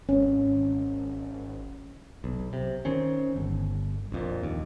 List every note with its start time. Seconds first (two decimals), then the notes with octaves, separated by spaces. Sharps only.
0.09 G#1 C#4
2.24 B1
2.53 C3
2.85 D#3 C4 C#4
3.36 G1
4.12 A#1 F2 A#2
4.43 D#2